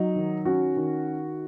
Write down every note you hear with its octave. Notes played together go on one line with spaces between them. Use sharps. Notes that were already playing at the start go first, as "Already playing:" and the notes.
Already playing: F#3 D#4
D#3
C#4 F#4
D#3